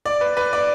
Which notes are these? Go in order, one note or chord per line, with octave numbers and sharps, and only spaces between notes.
D5
B4
B4
D5